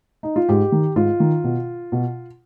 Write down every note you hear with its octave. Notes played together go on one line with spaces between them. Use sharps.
D#4
F4
G#2 G4
D#3
G#2 F4
D#3
B2
B2